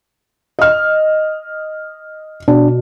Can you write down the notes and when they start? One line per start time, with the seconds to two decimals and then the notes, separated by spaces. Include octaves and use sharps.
0.59 D#5 F6
2.48 B2 D4